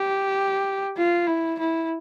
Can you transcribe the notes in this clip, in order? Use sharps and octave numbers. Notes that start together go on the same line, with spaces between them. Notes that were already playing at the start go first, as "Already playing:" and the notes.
Already playing: G4
F4
E4
E4